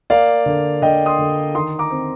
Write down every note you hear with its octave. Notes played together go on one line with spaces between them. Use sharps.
A#3 D5 F5
D3
D3 D#5 G5
C6 D#6
D3
D#3 C6 D#6
A#5 D6
C4